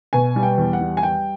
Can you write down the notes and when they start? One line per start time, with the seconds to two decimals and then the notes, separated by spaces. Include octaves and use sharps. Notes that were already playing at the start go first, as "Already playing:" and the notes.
0.13 B2 G#5
0.36 G3
0.43 G5
0.58 E2
0.73 F#5
0.81 G3
0.97 G#5
1.03 G3 G5